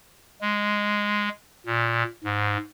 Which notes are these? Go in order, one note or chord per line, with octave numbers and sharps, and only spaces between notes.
G#3
A#2
G#2